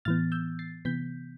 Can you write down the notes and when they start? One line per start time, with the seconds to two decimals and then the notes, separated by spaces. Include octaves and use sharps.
0.05 A2 E3 B3 F6 A6
0.32 E6 G6
0.59 A6 C7
0.85 C3 E3 B3 G6 B6